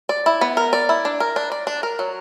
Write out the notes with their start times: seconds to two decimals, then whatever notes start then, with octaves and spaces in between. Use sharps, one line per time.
0.09 D5
0.26 E4
0.41 B3
0.57 A#4
0.73 D5
0.89 E4
1.05 D4
1.20 A#4
1.36 D4
1.52 D5
1.67 D4
1.83 A#4
1.99 F#3